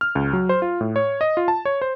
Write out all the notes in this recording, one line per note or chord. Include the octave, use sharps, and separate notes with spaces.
F6
C#2
F#3
C5
F4
A2
C#5
D#5
F4
A5
C#5
C5